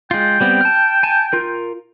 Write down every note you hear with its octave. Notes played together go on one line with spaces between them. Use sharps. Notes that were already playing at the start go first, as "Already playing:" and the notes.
G#3 F4 G5
G3 B3 C4
A5 F6
G#5 A5
F4 A#4